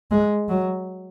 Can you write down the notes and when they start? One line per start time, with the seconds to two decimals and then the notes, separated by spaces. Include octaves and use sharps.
0.11 G#3
0.49 F#3